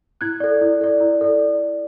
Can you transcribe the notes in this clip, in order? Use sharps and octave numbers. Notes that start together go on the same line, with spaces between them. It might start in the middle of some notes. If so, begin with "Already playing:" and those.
E4 F#6 G#6
A4 D5
E4
A4 D5
E4
A4 D5